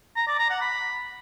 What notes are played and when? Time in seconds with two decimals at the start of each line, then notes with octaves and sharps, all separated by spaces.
0.16 A#5
0.28 D5
0.39 A#5
0.50 F#5
0.61 B5